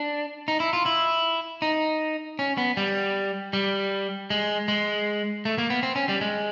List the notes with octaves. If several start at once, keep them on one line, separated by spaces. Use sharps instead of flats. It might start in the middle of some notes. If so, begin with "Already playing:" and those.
Already playing: D4
D#4
E4
F4
E4
D#4
C#4
B3
G3
G3
G#3
G#3
A3
A#3
B3
C4
C#4
G3
G#3